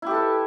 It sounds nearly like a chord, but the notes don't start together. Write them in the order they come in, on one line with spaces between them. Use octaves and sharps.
E4 G4 A4 B4